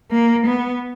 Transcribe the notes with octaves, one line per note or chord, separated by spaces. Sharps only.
A#3
B3